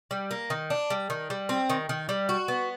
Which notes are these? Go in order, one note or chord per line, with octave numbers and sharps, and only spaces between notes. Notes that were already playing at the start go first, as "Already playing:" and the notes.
G3
A#3
D#3
D4
G3
D#3
G3
C4
D#3
D#3
G3
F#4
B3